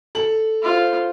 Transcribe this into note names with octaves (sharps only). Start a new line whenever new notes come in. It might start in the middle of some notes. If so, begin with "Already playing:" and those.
A4 F#7
F4 C5